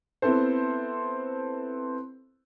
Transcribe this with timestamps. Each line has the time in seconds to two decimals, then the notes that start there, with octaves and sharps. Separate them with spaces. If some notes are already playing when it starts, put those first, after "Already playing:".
0.22 B3 C4 E4 A4 C5